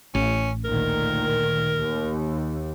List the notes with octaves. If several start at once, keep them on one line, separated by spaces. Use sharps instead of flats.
A1 C#4
D2 A#2 D#3 A#4
D#2